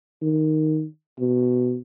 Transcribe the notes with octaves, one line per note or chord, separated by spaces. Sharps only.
D#3
B2